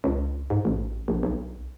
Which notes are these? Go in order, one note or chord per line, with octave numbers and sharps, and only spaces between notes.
C#2
G#2
A1
A#1
B1